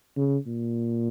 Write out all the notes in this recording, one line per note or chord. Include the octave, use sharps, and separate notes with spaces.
C#3
A#2